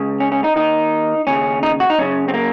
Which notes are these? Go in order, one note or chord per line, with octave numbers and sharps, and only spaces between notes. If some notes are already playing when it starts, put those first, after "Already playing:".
Already playing: C#2 C#3
C#4
C#4
D#4
D#2 D#3 D#4
D#2 C#3 C#4
D#4
F#4
D#4
F#2 C#3 C#4
C4
A#3